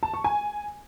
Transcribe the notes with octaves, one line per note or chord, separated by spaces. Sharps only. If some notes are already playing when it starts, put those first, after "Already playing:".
A5
C#6
G#5